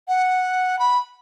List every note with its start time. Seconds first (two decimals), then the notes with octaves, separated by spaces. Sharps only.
0.08 F#5
0.79 B5